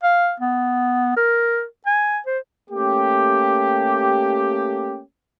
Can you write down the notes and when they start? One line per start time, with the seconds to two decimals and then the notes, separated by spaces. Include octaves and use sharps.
0.03 F5
0.40 B3
1.17 A#4
1.87 G#5
2.27 C5
2.71 A3 A#3 C#4 G4